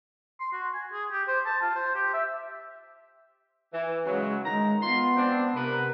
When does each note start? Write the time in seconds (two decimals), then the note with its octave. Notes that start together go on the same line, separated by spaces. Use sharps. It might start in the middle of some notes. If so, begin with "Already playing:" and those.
0.40 C6
0.53 F#4
0.74 G#5
0.93 G#4
1.11 G4
1.28 C5
1.46 A5
1.62 F4
1.75 C5
1.95 G4
2.14 E5
3.72 E3
4.05 C#3 F#3 G#3
4.44 D#3 G#3 A#5
4.82 B3 F4 C6
5.16 C4 D4
5.56 C3 B3 A#4 B4